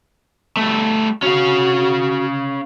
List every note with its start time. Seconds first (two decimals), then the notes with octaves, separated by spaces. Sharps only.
0.57 G3 A3
1.23 C#4 F#4 F5